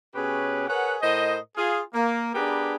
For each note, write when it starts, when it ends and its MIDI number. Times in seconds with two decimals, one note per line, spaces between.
0.15 0.67 47
0.15 0.67 61
0.15 0.67 67
0.15 0.67 68
0.15 0.67 71
0.15 0.67 73
0.68 0.97 68
0.68 0.97 70
0.68 0.97 71
0.68 0.97 73
0.68 0.97 78
1.02 1.37 45
1.02 1.37 70
1.02 1.37 72
1.02 1.37 75
1.57 1.81 65
1.57 1.81 68
1.94 2.34 58
2.35 2.76 59
2.35 2.76 62
2.35 2.76 67
2.35 2.76 68
2.35 2.76 70
2.35 2.76 71